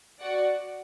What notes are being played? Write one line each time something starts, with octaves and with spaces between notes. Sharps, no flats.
F#4 D5 F#5